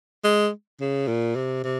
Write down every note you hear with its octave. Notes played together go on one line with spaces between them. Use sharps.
G#3
C#3
A#2
C3
C3